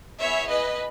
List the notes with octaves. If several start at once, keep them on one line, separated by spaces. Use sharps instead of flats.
B3 E4 G#4 C#5 E5
B4 D#5